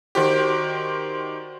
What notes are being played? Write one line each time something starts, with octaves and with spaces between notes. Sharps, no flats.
D#3 F#4 G4 C5 D5